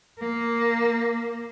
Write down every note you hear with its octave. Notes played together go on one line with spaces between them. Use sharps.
A#3